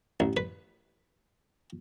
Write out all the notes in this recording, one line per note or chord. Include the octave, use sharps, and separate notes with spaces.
A1
B4